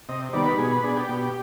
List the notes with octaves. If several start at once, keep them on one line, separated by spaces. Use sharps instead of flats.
C3 D#5
D#3 G3 B3 D5
B4
B2 G#4
B4
B3 D4 G#4
G4
B2